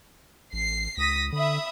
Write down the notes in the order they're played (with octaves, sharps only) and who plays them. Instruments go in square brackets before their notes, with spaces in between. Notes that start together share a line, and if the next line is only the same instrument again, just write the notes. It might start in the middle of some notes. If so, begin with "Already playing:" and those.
[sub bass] A1 [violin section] C7
[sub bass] C#2 [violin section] D#6 A#6 B6
[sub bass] D3 [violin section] E5 B5 D#6